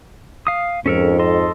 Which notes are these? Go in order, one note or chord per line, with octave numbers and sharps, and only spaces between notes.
F5 D#6
F2 G#2 C#4 A4 A#4
A4 D#5 C6